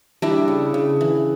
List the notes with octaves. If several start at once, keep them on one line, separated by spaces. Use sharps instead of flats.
G3 D4 E4
C#3
C#3
E3